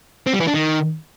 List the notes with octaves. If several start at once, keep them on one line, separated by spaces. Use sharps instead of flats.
C4
G3
E3
D4
D#3